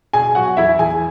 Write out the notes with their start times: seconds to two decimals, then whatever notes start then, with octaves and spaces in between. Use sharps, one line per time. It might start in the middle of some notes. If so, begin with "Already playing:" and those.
0.13 B2 G#4 G#5
0.35 F#3 F#4 F#5
0.57 E2 E4 E5
0.79 E2 G#4 G#5